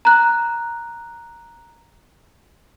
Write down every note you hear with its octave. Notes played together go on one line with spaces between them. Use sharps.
A#5 F#6